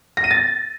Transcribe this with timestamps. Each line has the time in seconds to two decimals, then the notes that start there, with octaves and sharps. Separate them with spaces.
0.17 A#6
0.24 D#7
0.31 A6